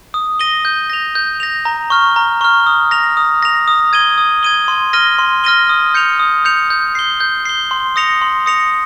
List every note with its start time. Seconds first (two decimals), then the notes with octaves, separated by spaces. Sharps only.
0.14 D#6
0.39 A#6 D#7 G7
0.65 G6
0.90 A#6 F7
1.15 G6
1.40 A#6 F7
1.65 A#5
1.90 C#6 F6
2.16 A#5
2.41 C#6 F6
2.66 D#6
2.91 A#6 F7
3.17 D#6
3.43 A#6 F7
3.68 D#6
3.93 G#6 D#7 G7
4.18 D#6
4.43 G#6 D#7 G7
4.68 C6
4.93 F6 A#6 D#7 G7
5.19 C6
5.44 F6 A#6 D#7 G7
5.69 D#6
5.94 G6 C#7 F7
6.19 D#6
6.45 G6 C#7 F7
6.70 G6
6.95 C7 G7
7.20 G6
7.45 C7 G7
7.71 C6
7.96 D#6 A#6 C#7 F7
8.21 C6
8.46 D#6 A#6 C#7 F7